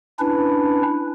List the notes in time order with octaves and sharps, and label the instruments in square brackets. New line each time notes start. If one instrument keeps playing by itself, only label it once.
[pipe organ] C#4 D4 E4 B4